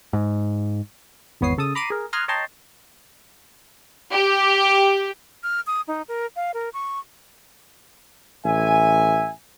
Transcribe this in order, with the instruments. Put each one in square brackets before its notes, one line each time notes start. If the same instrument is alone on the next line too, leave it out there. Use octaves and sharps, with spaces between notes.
[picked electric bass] G#2
[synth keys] G#1 E2 B3 C#5 D#6 C7
C#3 A4 A5 D#6
A#5 B5 D6 C7 D7 D#7
G#4 A#4
A#5 C6 D#6 F6 F#6 G#6
C#5 D#5 G5 A5 A#5 C6
[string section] G4
[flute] F6
D#6
D#4
A#4
F5
A#4
C#6
[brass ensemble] A1 E5 G#5